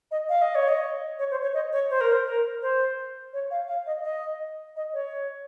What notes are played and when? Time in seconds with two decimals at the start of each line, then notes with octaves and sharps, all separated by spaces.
0.11 D#5
0.29 F5
0.42 D#5
0.55 C#5
0.68 D#5
1.19 C#5
1.31 C5
1.42 C#5
1.54 D#5
1.73 C#5
1.90 C5
2.01 A#4
2.12 C5
2.26 A#4
2.62 C5
3.33 C#5
3.51 F5
3.68 F5
3.86 D#5
4.04 D#5
4.76 D#5
4.94 C#5